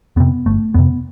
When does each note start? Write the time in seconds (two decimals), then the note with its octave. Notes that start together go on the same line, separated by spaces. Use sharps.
0.16 F2 C3 B3
0.46 G1 A3
0.74 F2 C3 B3